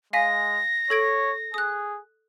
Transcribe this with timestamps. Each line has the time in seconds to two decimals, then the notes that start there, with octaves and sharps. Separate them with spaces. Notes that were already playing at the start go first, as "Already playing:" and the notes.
0.13 G#3 F5 G#5 A#6 B6
0.90 A4 C#5 G#6 D7
1.54 G#4 D#6 F#6